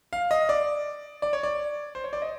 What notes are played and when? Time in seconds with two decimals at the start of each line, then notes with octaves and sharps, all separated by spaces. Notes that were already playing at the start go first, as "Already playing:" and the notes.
0.13 F5
0.31 D#5
0.49 D5
1.22 D5
1.33 C#5
1.43 D5
1.95 C5
2.04 C#5
2.13 D5
2.22 D#5